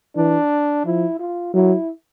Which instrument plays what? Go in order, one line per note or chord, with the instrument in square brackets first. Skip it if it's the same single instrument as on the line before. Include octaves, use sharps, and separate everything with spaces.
[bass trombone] E3 [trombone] D4
[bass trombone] F3 [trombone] E4
[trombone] F4
[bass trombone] F#3 [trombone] E4